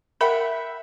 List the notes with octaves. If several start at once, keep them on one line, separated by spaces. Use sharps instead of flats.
A#4 E5 F#5 G5 B5